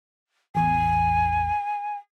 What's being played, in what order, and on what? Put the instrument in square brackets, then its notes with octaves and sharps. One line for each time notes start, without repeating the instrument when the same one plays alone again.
[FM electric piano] A1 E2 [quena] G#5